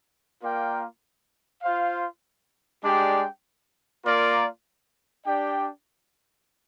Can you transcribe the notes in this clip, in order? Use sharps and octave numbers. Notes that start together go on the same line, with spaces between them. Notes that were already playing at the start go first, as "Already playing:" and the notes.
A#3 F4 A#4 D5 G5
F4 C5 F5
G#3 D4 G4 D5 G5
A#3 F4 A#4 D5
D4 G4 D5 G5